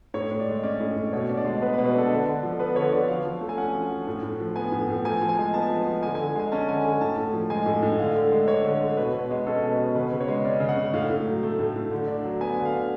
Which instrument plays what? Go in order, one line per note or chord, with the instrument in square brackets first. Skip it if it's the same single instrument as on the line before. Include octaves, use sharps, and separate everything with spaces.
[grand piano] A2 C#5
A2
D5
G#3
C#4 D5
A2
A2
D5
B2 C#5
D4
D5
G#3
B3 B4
B4
B2
B4
D4 A4
D3
D3
F3
B3 B4
D3 C#5
D3 D5
F3 F5
F3
A3
G#5
C#4 F#5
F3
F3
A2
A2
F3
B3 G#5
A2
A2
F3 G#5
F3
G#5
G#3
B3 A5
F3
F3
D3 G#5
D3 G#5
G#3 G#5
C#4 A5
D3 G#5
D3 G#5
A2 A5
A2
F3
G#3 G#5
A2
A2
D3 F5
D3
G#3
D4 C#5
D3
D3
B2 B4
B2
G#3
C#4 A4
B2
B4
B2
C#3 B4
C#3
C#5
G#3
C#4 D5
C#3
F#5
C#3
A2 F5
A2
F#3
A3
A2
A2
D3
D4
F#3
B3 G#5
D3
F5
D4